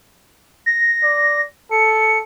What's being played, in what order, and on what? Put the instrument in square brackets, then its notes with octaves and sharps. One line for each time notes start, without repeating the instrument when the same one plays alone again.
[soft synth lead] A#6
[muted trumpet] D5
[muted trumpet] A4 [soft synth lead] C#7